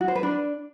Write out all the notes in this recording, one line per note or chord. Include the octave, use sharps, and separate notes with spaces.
F#4
C5
B4
D4